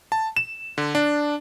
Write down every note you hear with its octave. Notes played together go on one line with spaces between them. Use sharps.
A5
E7
D3
D4